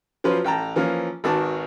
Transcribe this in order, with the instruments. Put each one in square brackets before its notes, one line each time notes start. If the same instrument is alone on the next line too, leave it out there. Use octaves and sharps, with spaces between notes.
[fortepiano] F3 F#3 C#4 B4 C5
A1 G5 A5 A#5
E3 F3 A#3 C#4
G#1 D#3 F#4 B4 A5 D6